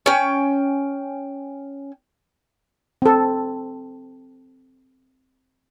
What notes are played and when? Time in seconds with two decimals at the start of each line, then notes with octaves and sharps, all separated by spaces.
0.06 C#4 G5
3.02 C4 A4